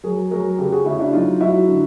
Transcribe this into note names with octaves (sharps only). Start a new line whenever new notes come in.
F#3 G#4 A#4
F#3 G#4 A#4
C#3 G4 A4
F#4 G#4
C#3 E4 F#4
D4 E4
F#3 D#4 F4
F#3 E4 F#4
D3